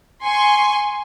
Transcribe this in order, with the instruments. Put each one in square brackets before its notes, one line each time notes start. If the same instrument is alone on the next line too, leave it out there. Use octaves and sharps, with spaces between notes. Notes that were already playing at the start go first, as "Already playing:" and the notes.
[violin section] G#5 C6 C#6